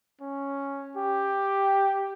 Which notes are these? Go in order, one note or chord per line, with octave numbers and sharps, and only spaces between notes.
C#4
G4